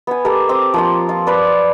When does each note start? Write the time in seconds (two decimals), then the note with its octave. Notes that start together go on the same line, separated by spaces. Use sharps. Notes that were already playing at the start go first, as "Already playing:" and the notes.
0.07 B3 G#5
0.25 G4 A4 A#4
0.49 C4 D6 D#6
0.74 F3 A#3 F4
1.09 F4
1.27 B4 D5